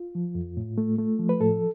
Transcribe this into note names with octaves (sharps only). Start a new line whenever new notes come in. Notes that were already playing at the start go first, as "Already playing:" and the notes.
Already playing: F4
F3
F2
A2
A3
A3
F3
B4
A2 A4